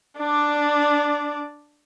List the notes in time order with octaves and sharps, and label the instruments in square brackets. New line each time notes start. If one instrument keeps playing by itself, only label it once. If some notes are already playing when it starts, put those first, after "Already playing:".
[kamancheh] D4 D5